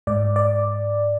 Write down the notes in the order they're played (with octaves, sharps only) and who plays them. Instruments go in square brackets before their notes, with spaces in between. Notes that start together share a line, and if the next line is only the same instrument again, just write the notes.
[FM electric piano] G#2 D5
D5